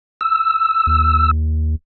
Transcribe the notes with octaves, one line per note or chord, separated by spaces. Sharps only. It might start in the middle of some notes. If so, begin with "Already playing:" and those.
E6
D#2